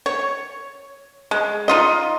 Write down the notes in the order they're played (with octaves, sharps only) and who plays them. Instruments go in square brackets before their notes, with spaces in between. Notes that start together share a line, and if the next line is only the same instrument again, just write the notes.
[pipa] C#5
G#3
D#4 F4 D#5